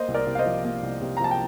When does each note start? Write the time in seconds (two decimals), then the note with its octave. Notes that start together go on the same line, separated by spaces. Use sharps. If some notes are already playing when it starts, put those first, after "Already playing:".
Already playing: A#3 C5 D#5
0.08 C2
0.14 A#4 D5
0.27 C3
0.35 F5
0.39 C5 D#5
0.46 F3
0.64 A#3
0.82 C2
1.02 C3
1.17 A#5
1.20 F3 A5
1.31 G5